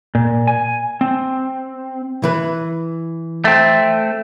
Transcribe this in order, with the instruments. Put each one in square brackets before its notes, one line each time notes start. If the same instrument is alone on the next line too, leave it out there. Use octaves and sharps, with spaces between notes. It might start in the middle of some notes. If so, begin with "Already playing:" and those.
[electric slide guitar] A#2
G#5
C4
[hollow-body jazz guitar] E3 B4
[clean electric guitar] A3 C4